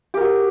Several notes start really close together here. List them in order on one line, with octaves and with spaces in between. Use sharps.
G4 A#4 F#4